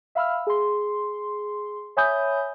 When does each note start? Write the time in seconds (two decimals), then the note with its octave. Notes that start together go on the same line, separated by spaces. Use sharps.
0.15 E5 F5 B5 E6 F6
0.47 G#4 C6
1.97 C#5 E5 G#5 B5 D#6 G6